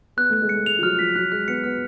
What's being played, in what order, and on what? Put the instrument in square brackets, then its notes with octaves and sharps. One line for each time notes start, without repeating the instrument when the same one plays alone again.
[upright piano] B3 [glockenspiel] F#6
[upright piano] A3 [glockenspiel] F#6
[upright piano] G#3
[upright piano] A3 [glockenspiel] C#7
[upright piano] G#3 [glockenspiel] F7
[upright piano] F3
[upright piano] F#3 [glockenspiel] F6
[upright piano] F3 [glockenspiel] B6
[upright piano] F#3 [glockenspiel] F#6
[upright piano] G#3 [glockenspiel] F#6
[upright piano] B3 [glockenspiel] C#7
[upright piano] B3 [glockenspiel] F6